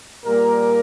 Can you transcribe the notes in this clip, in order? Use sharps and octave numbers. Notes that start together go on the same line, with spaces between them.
A#2 G3 A#3 A#4